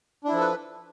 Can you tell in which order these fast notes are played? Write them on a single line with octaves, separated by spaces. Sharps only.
D4 E4 F3 A4 B4